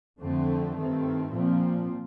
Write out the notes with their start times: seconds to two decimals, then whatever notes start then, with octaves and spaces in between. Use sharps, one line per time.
0.19 F2 D3 A3 C4
0.76 G2 D#3 A3 C4
1.32 A#2 F3 C4